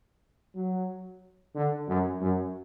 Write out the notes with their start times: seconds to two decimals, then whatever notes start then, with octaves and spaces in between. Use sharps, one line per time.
0.55 F#3
1.55 D3
1.88 F#2
2.21 F#2